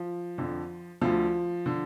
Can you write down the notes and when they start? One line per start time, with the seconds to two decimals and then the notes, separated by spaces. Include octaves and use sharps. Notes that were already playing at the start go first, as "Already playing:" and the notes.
Already playing: F3
0.38 F2 D3
1.01 D2 D3 F3
1.66 D3